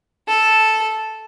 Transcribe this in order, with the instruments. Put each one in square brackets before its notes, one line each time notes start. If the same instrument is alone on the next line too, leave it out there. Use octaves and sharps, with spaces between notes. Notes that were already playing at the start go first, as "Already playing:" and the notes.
[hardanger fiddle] A4